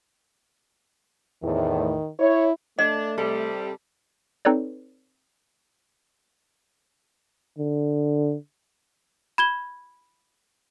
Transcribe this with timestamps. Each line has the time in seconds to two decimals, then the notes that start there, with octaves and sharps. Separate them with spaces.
1.43 E2 A2 D#3
2.19 E4 C#5
2.79 A3 D4 D#5
3.18 C3 G3 A4
4.45 C4 D#4 A4 B4 C#5 D5
7.59 D3
9.38 B5 G#6 G7